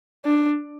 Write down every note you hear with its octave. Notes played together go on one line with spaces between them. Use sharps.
D4